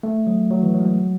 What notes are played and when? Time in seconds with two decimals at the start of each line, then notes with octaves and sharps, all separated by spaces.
0.03 A3
0.27 F#3
0.50 F#3
0.63 E3
0.74 F#3
0.80 G#3
0.85 F#3